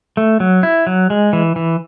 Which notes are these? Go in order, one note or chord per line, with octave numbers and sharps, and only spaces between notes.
A3
F#3
E4
F#3
G#3
E3
E3